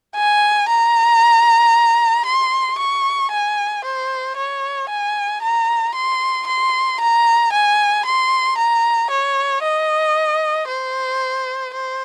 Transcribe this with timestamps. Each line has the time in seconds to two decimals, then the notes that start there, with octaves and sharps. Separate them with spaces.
0.16 G#5
0.69 A#5
2.25 C6
2.78 C#6
3.31 G#5
3.84 C5
4.37 C#5
4.90 G#5
5.42 A#5
5.95 C6
6.47 C6
7.00 A#5
7.52 G#5
8.05 C6
8.57 A#5
9.10 C#5
9.63 D#5
10.68 C5
11.74 C5